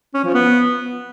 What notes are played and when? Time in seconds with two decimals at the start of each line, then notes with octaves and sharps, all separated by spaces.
0.14 C#4
0.24 F3
0.34 B3